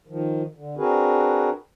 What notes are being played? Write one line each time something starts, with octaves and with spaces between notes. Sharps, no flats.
D#3 F3
D3
C4 D4 F#4 G#4 A#4 B4